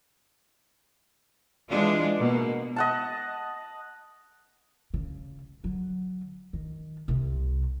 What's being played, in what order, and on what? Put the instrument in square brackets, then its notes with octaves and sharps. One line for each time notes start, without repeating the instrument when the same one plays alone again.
[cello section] E3 G#3 D4 F4
B2 A#3
[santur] D#5 F#5 A5
[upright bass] C#3
D3 F#3
D#3
C2 C3